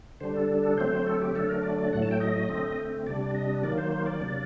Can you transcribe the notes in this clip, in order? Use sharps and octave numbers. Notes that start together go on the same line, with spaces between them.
D3 G3 D4 C5
A4
A4
A4
D3 F#3 A3 C4 C5
C5
A4
G4
D3 F#3 A3 D4 A4
A#4
D5
D5
A2 F#3 A3 F#5
A5
G5
D#5
D3 A3 C4
C3 G3 D4 D5
D5
D#5
D#3 F#3 A#3 D5
C5
C5
D5
C3 F#3 A#3 D4